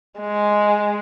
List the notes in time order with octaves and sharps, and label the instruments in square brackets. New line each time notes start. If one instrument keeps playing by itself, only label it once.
[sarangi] G#3